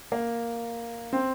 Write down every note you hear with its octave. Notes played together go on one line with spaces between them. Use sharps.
A#3
C4